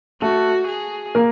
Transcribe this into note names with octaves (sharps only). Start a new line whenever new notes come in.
A3 F#4 A4
G#4
A#3 A#4